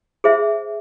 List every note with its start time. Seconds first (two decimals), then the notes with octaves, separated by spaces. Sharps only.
0.24 G#4 C5 E5